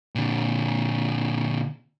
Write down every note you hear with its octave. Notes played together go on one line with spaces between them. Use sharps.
A#2 D3